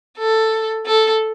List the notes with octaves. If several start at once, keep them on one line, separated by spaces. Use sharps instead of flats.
A4
A4